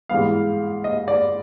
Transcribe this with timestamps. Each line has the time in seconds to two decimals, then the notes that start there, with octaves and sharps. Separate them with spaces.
0.09 G#2 E3 G3 B3 F5
0.84 D#5
1.08 D5